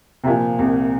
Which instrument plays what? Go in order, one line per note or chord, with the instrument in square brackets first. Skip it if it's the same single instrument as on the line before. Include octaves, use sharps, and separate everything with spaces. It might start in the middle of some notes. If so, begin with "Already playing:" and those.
[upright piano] C3
[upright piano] A#2 [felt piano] F3
[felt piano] C2